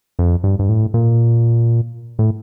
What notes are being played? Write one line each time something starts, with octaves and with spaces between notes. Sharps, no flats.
F2
G2
G2
A2
A#2
A2